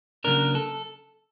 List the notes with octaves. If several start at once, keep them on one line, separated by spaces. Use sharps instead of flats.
C#3 F#3 A#3 D4 A#4
A4